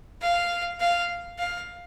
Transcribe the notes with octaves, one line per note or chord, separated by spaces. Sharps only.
F5
F5
F5